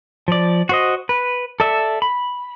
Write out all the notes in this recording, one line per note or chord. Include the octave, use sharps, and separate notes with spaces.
F3 D5
F#4 C5 D#5
B4
A4 D5 E5
B5